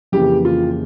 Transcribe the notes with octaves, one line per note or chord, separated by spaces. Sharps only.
F2 C#3 E3 A#3 G4
F4